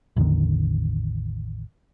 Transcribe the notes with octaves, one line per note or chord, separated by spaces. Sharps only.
A1 E2 D3 D#3